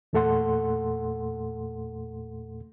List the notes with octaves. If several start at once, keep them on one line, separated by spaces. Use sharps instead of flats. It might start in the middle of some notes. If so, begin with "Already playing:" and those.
E2 A#2 A3 A4 F#5 C6